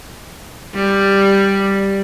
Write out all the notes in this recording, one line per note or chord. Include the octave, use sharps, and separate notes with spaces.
G3